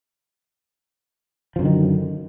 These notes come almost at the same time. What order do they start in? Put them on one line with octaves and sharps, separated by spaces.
F3 F#2 D3 D#3